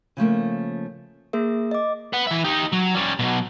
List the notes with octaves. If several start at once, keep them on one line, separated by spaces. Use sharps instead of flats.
C#3 F3 A3 A#3
A#3 G#4 A#4 E5
D#5 D6
B4 F#5
E3 E5
D#4 G4
F#3
G3 C#4
B2 F#3